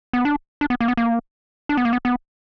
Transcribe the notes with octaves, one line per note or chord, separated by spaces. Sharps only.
B3
D4
D4
B3
A#3
B3
A#3
D4
B3
A#3
B3
B3